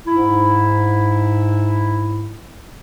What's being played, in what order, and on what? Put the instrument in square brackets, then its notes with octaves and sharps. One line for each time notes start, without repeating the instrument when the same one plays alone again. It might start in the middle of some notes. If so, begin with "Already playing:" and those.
[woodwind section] G#2 E4